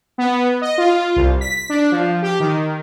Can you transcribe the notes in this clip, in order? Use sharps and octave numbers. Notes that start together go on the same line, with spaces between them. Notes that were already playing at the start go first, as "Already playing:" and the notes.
B3
D#5
F4
C2
B6
D4
F3
G4
D#3